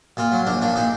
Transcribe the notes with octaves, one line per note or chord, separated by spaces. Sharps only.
A#2 F4
F#3
A#1 D4
A#2 D4
A#2 D#4